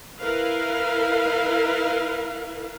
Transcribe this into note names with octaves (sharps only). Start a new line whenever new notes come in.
E4 A#4 B4 F5